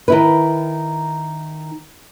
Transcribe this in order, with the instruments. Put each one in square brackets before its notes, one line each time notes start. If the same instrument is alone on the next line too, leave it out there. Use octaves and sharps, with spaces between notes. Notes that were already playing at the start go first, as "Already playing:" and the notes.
[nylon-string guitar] D#3 E4 B4